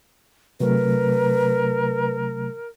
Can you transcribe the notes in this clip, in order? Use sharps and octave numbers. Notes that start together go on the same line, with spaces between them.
C3 F#3 A3 A#4 B4